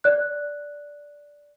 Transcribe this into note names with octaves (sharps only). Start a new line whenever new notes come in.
D5 F#6